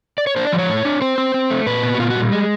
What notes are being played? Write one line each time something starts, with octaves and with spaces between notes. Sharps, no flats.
D5
C#5
D4 C5
D5
F3
C#5
A2
D4
C4 C5
C4
C4
A3
A#2 B4
B3
F#4
A#2 F4
F#4
G3
G#3